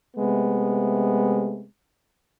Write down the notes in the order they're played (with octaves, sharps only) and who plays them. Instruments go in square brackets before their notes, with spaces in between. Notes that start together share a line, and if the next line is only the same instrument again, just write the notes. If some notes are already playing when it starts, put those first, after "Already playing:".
[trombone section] C3 G#3 A3 B3